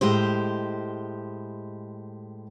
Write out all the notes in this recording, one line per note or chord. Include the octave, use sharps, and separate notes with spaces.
A2 G#3 G4 C5